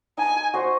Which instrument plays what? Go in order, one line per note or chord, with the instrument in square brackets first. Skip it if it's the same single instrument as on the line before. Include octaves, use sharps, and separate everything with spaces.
[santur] D#4 [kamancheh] G#5
[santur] F#4 C5 D#5